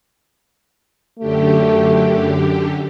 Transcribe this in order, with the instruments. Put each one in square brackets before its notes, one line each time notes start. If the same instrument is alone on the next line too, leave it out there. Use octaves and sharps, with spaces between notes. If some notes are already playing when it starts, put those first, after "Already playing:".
[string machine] F#2 D3 G4 [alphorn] A3